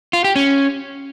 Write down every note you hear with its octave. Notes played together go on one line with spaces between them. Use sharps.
F4
G4
C#4